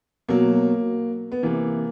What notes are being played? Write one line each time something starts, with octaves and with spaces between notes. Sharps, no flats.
B2 F#3 A#3
B3
C3 E3 A#3